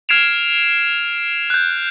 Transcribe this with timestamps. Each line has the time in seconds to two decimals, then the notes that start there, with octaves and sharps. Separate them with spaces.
0.09 F6 G#6 C7 D7 E7 F7
1.50 F#6 G6